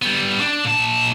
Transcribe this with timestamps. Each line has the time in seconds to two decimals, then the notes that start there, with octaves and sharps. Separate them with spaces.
0.02 G3 B3
0.41 D4
0.65 A#2 A5